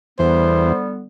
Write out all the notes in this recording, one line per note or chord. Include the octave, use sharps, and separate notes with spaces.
E2 D3 G3 B3 C5